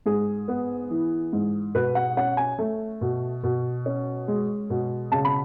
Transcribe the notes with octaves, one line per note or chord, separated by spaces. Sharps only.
G#2 G#4
B3
E3
G#2
B2 B4
F#5
C#4 F#5
G#5
A3
B2
B2
C#4
G#3
B2
C#3 A5
B5